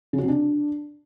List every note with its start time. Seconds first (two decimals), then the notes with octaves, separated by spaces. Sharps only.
0.13 C#3
0.18 F#4
0.23 C3
0.29 D4